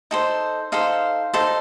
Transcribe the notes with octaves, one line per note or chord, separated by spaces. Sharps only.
D#4 A4 C5
D#4 A4 C5 F5
D#4 A4 C5